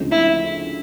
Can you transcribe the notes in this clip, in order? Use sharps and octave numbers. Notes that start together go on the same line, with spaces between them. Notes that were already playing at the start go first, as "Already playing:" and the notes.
Already playing: D2 C#3 F3 G#3 C4
E4